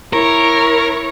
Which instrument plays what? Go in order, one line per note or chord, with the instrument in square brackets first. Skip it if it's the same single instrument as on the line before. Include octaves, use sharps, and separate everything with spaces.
[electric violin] E4 C#5 [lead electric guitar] A#4